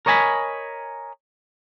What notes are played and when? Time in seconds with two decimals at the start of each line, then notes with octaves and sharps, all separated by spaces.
0.06 A#4 C#5 D#5 G#5 A5 B5